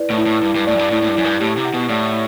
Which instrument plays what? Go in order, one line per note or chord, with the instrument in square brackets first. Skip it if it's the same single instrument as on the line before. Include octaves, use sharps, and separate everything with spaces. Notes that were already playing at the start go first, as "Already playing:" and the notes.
Already playing: [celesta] E4 B4 D5
[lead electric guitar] A2
[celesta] E4
[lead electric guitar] A2
[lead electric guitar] G2 [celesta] E4
[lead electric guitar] G2
[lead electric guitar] A2 [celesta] D5
[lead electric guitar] F#2
G2
[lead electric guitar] A2 [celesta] E4
[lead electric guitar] A2
G2
[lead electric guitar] F#2 [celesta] E4
[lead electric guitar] G2
[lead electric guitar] A2 [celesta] G4
[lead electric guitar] C3
[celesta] F#5
[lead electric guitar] B2
[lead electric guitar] A2 [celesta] D5